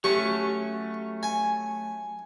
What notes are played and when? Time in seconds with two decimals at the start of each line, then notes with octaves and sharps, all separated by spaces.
0.04 F#3 A3 C#4 G4 C#6
1.23 G#5